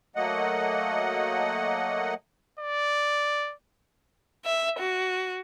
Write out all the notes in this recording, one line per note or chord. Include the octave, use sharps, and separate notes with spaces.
F#3 A3 A#3 D#5 F#5
D5
E5
F#4